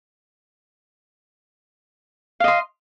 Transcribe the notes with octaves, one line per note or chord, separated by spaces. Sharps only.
D#5 F5 C6